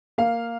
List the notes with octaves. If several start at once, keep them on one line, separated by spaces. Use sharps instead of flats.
A#3 F5